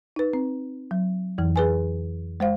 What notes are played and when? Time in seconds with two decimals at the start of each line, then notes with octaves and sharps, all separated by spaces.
0.16 D#4 B4
0.33 C4
0.91 F#3
1.38 F2 E3
1.56 G#4 B4 G#5
2.40 G#3 C5 F5